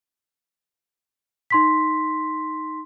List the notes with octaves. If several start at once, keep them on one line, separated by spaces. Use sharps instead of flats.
D#4 C6 B6